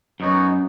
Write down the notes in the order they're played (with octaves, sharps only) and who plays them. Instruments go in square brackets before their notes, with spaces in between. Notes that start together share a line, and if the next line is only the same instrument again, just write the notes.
[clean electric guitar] F#2 [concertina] B3 D#4 F#4 C#5